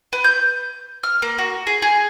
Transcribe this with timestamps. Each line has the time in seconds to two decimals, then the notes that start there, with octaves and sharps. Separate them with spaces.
0.13 B4
0.24 G6
1.03 F6
1.22 A#3
1.38 F#4
1.67 G#4
1.82 G#4